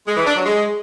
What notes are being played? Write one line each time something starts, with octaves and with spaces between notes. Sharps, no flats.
G#3
E3
D4
F#3
G#3